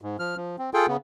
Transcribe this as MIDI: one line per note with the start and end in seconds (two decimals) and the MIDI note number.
0.02 0.17 44
0.19 0.36 53
0.19 0.36 89
0.37 0.56 53
0.59 0.70 60
0.74 0.86 65
0.74 0.86 68
0.74 0.86 69
0.74 0.86 79
0.88 0.97 49
0.88 0.97 59